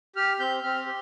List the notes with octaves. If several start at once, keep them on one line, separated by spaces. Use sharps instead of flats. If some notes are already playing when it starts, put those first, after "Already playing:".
G4 F6
C4 G6
C4 F6
G4